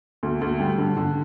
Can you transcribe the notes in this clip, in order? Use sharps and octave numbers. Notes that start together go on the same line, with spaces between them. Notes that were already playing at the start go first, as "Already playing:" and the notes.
D2
D2
G3
D3
D3